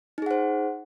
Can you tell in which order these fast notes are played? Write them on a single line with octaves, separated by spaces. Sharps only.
D#4 G#4 F#5 C5